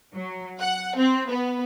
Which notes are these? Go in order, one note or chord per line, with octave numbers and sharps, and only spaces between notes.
F#3
F#5
C4
B3